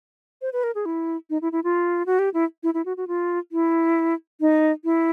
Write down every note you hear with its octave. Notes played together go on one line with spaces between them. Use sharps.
C5
B4
A#4
G#4
E4
D#4
E4
E4
F4
F#4
G4
E4
E4
E4
F#4
F#4
F4
E4
D#4
E4